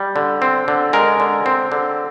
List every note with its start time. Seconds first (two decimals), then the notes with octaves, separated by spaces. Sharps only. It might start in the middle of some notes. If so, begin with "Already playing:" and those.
Already playing: G3
0.16 D3
0.42 C4
0.68 D3
0.93 G#3 A#4
1.20 D3
1.46 C4
1.72 D3